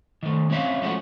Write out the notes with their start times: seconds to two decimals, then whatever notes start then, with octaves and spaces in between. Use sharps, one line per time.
0.23 D#3 A3
0.50 G#3 C4 C#4 C#5 E5 F5
0.81 F3 G#3 A3 C#4 E4 F#4